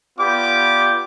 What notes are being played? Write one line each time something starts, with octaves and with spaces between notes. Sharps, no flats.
B3 F4 G4 D5 D6